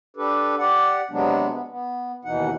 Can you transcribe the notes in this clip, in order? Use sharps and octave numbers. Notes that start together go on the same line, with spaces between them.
D4 G4 A4 B4
G4 D5 F#5
C3 F#3 G#3 B3 D4
B3
B3
D#2 B2 E3 D#4 F#5